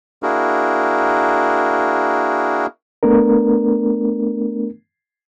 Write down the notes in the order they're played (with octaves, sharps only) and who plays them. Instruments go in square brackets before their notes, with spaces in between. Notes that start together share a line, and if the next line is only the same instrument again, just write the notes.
[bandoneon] A#3 D4 E4 F#4 G#4 A#4
[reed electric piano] A3 B3 D4 A#4